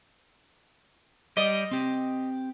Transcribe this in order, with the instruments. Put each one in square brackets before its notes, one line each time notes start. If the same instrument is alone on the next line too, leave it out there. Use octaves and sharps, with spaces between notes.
[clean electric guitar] G3 D5 [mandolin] D#5
[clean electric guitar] C4 G4